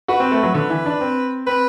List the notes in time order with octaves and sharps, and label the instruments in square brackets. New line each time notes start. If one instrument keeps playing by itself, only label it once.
[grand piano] F#4 [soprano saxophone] B4
[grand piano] C4
A3
F#3
[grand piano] D3 [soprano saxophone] B4
[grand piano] E3
D4
C4
[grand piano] C4 [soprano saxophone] B4